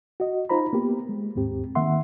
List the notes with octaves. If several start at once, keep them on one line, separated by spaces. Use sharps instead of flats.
F#4 D#5
D#4 F4 C5 A#5 B5
A#3 B3 G4
G#3
D#2 G#2 C4 G4
D#3 A#3 E5 F#5 C6